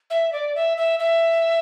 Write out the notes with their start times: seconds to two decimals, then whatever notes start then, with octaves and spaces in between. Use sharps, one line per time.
0.10 E5
0.33 D5
0.55 E5
0.77 E5
1.00 E5